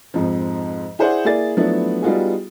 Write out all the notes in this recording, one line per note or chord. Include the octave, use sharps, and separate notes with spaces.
F2 G#2 F3
E4 G#4 C5 D5 F#5
A#3 E4 G#4 D5 A6
F3 F#3 A3 B3 D4 E4
G3 B3 D#4 F4 F#4 G#4